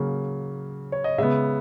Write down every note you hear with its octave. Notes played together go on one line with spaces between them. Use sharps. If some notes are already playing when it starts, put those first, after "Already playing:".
Already playing: C#3 F#3 A#3
C#5
D#5
C#3 G#3 B3 E5